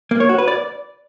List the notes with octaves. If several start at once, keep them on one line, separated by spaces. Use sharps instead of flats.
A#3
C#5
F#4
B4
D5